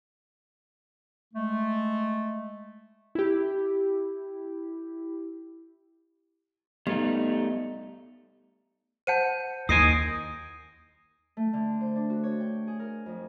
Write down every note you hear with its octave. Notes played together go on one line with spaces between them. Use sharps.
G#3 A3
E4 G4
G3 A3 B3 D#4
C5 F#5 A5 G6 C#7 D#7
D#2 D#3 D#5 G#5 D#6 C7 D7
A3
D3
C5
D4
F#4
C#5
G5
G#4
A#4
F2